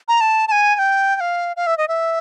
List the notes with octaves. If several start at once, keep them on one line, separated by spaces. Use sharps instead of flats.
A#5
A5
A5
G#5
G#5
G5
G5
F5
F5
E5
D#5
E5